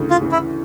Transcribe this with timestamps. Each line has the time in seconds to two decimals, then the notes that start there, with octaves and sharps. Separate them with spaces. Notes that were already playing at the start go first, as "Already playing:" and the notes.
Already playing: D2 C#3 E3
0.10 F4
0.21 C#3 E3
0.32 E4